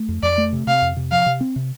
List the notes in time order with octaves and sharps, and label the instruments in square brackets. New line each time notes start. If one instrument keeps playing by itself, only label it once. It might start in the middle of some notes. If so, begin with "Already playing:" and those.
Already playing: [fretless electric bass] A3
F2
[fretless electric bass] F2 [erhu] D5
[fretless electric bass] A3
C3
[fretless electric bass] C3 [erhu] F5
[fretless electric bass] F2
C3
[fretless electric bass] F3 [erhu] F5
[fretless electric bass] C3
C4
C3